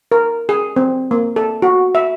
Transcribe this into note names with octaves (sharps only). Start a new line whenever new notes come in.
A#4
G#4
C4
A#3
A4
F#4
E5